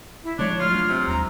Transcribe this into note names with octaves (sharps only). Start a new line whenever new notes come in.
E4
F3 G#3 A3 D4 C#5
F4 F6
F#3 D4
C3
D#2 G#3 A#5